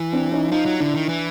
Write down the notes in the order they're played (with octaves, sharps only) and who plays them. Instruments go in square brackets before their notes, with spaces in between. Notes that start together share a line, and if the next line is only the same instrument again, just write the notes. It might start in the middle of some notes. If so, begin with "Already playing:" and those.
Already playing: [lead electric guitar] E3
[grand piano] C4 D4
C#4 D#4
[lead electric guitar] F3 [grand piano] D#4 F4
[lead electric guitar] F#3
[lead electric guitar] D3 [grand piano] D4 E4
[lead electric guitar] D#3
E3